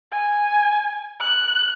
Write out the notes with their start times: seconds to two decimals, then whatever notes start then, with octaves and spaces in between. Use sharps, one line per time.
0.12 G#5
1.20 F#6